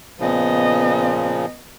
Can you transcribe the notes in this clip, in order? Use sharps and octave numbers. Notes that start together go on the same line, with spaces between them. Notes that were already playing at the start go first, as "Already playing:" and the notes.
A#2 C#3 F3 B3 D#5